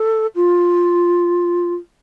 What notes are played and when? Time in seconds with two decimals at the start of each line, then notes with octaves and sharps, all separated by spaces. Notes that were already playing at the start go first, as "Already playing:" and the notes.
Already playing: A4
0.36 F4